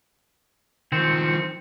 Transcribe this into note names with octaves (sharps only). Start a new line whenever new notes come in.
D#3 F3 C4 C#7